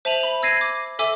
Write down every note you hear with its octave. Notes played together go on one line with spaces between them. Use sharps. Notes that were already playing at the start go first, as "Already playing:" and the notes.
C5 E5 A5 D#7 F7 F#7
B5
E6 G#6 A#6 C7 D#7
D6
A4 E5 G#5 D6 E6